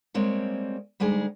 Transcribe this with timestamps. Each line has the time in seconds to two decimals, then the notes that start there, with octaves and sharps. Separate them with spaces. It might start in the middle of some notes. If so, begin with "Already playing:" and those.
0.14 G3 G#3 A#3 C4 C#5
1.00 D2 G3 G#3 D#4 G#4